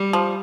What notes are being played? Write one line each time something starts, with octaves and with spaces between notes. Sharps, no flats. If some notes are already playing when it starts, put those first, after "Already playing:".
Already playing: G3
F3